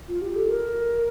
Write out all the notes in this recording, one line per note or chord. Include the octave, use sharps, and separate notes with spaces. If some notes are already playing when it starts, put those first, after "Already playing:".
F4
G4
A4
A#4